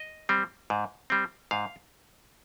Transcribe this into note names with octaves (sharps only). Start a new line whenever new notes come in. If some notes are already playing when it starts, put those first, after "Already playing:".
Already playing: D#5
G3 C4
G#2
G3 C4
G#2 F5